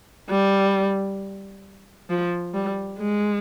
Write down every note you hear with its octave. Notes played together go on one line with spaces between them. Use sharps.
G3
F3
G3
G#3